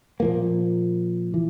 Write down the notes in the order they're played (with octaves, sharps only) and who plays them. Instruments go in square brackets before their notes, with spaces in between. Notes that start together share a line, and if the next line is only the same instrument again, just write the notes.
[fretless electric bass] A#2 F3 A#3
E3